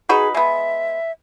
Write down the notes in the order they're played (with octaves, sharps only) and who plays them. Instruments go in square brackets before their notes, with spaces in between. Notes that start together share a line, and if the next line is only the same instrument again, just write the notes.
[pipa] D#4 F#4 B4 [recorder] G#4
[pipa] G#3 B3 [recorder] E5